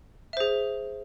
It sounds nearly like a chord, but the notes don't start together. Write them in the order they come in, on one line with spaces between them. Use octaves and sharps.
E5 C5 G#4